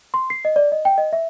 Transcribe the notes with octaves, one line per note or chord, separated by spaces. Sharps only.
C6
C7
D#5
D5
D#5
G5
D#5
E5